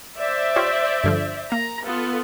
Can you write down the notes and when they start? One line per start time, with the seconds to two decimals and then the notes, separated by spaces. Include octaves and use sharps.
0.19 C5 D5 E5
0.56 F4 G4 C#5
1.04 G2 D3 F3
1.52 A#3 A#5
1.83 B3 F4 A4